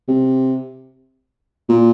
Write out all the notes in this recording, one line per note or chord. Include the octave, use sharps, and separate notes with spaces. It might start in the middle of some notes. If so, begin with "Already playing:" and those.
C3
A#2